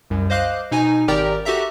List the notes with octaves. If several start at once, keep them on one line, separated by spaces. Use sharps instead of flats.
C2 F#2
C5 D#5 F5 D6 F#6
B2 D#4 G#5
G#1 G4 A#4 D5 G5 A#5
F#4 G4 A4 E5 A#5